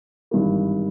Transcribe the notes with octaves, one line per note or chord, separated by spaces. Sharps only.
G#1 G2 E3 A#3